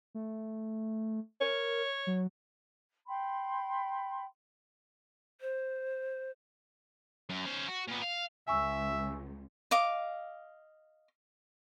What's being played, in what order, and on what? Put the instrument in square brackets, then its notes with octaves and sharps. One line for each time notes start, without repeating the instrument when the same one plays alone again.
[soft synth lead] A3
[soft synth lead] A#4 [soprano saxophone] C#5
[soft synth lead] F#3
[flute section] G5 B5 C6
[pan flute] C5
[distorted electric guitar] F#2
C#4 C5
F#4
A#2 B3
F5
[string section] C#2 [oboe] E5 [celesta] G#5 C#6 E6
[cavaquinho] D#5 F5 D6